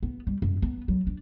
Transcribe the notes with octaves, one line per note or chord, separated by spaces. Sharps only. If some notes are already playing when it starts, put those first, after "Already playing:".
B3
G3
F#2
B3
F#3
D4